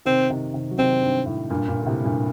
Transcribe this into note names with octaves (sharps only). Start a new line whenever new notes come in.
C3 D#3 C4
C3 D#3
C3 D#3
F#3
C3 D#3 C4
G2
A2
G2 A#2
G2 A#2
D3
A2 C3
G2 A#2